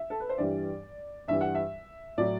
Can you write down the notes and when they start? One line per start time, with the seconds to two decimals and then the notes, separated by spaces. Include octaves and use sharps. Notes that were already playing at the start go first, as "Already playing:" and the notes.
Already playing: E5
0.10 A4
0.20 B4
0.29 C5
0.38 G2 E3 G3 D5
1.28 G2 E3 G3 E5
1.41 F#5
1.55 E5
2.18 A2 F#3 D5